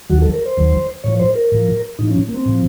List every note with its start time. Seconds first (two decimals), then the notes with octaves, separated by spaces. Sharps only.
0.09 D#2 D#3 F#3 F#4
0.22 A4
0.34 A#4
0.46 C5
0.57 D#2 D#3 F#3
1.04 A2 F3 C#5
1.19 C5
1.35 A#4
1.52 A2 F3
1.99 A2 F3 D#4
2.11 C#4
2.28 A#3
2.34 C4
2.46 A2 F3